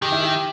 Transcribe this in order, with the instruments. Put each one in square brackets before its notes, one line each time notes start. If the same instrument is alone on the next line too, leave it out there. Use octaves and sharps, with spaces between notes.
[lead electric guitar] D#3 [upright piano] G4
[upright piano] E4
G4